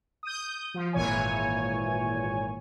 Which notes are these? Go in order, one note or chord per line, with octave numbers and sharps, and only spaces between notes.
D#6 G6
F3
G#1 A#2 E3 C#5 G#5